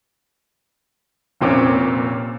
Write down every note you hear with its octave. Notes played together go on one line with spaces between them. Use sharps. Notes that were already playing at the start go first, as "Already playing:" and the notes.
F1 A#2 C4 C#4 D6